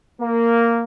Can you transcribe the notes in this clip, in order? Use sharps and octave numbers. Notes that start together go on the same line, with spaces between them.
A#3